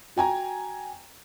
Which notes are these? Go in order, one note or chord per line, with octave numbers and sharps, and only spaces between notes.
F#4 G5 G#5 A#5